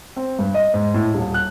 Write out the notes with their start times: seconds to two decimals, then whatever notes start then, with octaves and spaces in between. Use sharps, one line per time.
0.17 C4
0.39 G2
0.54 D#5
0.74 G#2
0.94 A2
1.14 D#1
1.34 F#6